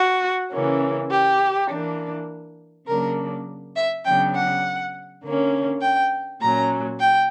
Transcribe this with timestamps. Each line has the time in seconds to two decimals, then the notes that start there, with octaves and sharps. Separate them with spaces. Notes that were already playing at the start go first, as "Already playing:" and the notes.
Already playing: F#4
0.51 C#3 E3 A#3 C#4
1.10 G4
1.69 E3 A#3 D4
2.87 C#3 F#3 A#3 D4 A#4
3.76 E5
4.05 C#3 F#3 B3 D4 G5
4.34 F#5
5.23 D3 A#3 C#4
5.81 G5
6.41 A#2 F#3 C#4 A#5
6.99 G5